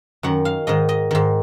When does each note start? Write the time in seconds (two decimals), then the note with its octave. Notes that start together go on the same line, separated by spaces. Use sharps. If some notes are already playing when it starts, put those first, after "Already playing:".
0.23 F#2 D#3 F#5
0.45 F5
0.67 G#2 D#3 D#5
0.89 D#5
1.11 G#2 D#3